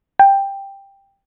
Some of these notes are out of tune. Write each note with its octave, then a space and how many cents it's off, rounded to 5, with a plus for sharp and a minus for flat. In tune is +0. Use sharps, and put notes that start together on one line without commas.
G5 +10